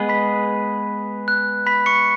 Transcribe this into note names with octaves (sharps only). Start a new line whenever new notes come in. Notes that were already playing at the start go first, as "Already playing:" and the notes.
Already playing: G#3 B3 G#4 B4 D#5
B5 B6
F#6
B5 B6
C#6 C#7